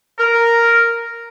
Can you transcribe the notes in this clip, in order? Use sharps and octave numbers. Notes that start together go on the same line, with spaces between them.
A#4